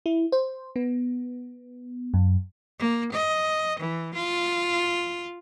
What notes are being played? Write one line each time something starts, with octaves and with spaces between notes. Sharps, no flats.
E4
C5
B3
F#2
A#3
D#5
E3
F4